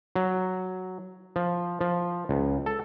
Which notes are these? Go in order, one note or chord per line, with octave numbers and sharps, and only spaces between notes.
F#3
F3
F3
C#2
A4